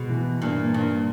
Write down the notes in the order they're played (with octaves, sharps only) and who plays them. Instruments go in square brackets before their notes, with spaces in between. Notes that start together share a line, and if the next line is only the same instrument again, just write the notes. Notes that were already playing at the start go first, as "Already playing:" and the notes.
Already playing: [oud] B2 [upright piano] G#3
[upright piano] E3
[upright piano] G2 [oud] A#2
[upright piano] G2 [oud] A#2